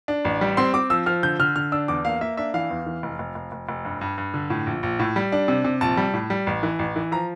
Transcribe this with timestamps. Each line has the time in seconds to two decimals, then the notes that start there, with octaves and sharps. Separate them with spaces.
0.08 D4
0.25 A1
0.41 G3
0.57 C4 C6
0.74 C4 D6
0.90 F3 E6
1.06 F3 F6
1.23 D3 G6
1.39 D3 F6
1.56 D3 F6
1.72 D4 E6
1.88 E2 D6
2.05 A#3 F5
2.21 A#3 E5
2.37 D4 E5
2.54 E3 F5
2.70 E2
2.86 E3
3.03 F1
3.19 F1
3.35 F1
3.52 F1
3.69 F1
3.85 G2
4.01 G2
4.18 G2
4.34 D3
4.50 A2
4.67 A#1
4.83 A#1
4.99 A2
5.16 G3
5.32 D4
5.48 C3
5.65 C3
5.81 A#1 A5
5.97 G3
6.14 A2
6.30 G3
6.47 A1
6.63 E3
6.79 A1
6.96 E3
7.12 F3 A#5